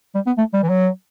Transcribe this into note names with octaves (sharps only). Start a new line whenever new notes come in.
G3
B3
A3
G3
E3
F#3